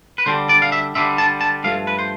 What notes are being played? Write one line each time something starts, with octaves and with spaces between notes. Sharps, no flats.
B4
D3 G3 D4 C5
D5
F5
E5
D3 G3 D4 E5
A5
A5
G2 F3 A3 F5
B4
C5